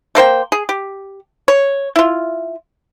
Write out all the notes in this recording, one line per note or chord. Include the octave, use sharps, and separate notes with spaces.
A3 A#3 C5 G5
G#4
G4
C#5
E4 F4